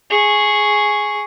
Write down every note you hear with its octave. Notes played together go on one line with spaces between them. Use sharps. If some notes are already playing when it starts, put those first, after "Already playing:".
G#4 C#6